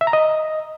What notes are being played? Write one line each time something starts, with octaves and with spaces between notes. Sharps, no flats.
E5
A#5
D#5